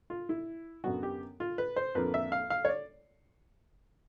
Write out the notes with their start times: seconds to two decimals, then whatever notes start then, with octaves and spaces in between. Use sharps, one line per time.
0.10 F4
0.29 E4
0.84 F#2 D3 F#3 B3 F#4
1.03 G4
1.40 F4
1.58 B4
1.76 C5
1.95 F2 D3 F3 A#3 B4
2.14 E5
2.32 F5
2.50 F5
2.65 C#5
2.69 D5